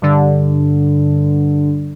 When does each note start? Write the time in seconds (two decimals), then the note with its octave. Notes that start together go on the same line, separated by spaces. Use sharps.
0.02 G2 D3